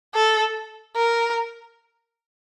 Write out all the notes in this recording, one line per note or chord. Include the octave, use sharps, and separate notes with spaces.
A4
A#4